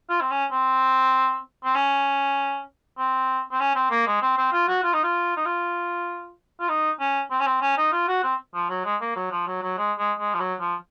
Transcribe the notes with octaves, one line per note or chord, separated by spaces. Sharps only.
F4
C4
C#4
C4
C4
C#4
C4
C4
C#4
C4
A#3
G#3
C4
C4
F4
F#4
F4
D#4
F4
D#4
F4
F4
D#4
C#4
C4
C#4
C4
C#4
D#4
F4
F#4
C4
F3
F#3
G#3
A#3
F#3
F3
F#3
F#3
G#3
G#3
G#3
F3
F#3
F3